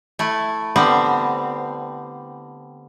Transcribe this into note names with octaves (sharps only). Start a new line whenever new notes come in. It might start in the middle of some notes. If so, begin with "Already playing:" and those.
A3 E4
D3 G3 B3 C4